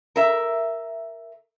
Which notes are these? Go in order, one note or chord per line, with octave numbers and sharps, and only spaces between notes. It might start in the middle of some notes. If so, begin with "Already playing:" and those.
A#4 E5